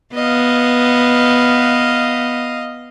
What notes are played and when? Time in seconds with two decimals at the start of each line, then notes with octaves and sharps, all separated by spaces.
0.15 B3 D#5 F5